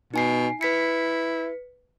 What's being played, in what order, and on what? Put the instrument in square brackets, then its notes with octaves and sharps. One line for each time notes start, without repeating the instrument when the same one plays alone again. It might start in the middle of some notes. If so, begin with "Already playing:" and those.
[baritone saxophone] B2 [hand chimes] D#4 G#5 C7
[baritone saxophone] E4 [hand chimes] B4 B6 C#7